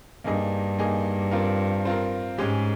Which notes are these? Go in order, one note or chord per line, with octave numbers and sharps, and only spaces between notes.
G2 A#3 D#4 G#4 D#5
A#3 D#4 G#4 D#5
C4 F4 A#4
C4 F4 A#4
G#2 G#3 C#4 G4